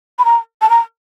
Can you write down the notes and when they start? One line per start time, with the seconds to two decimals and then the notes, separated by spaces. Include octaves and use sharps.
0.19 B5
0.25 A#5
0.62 A5
0.70 A#5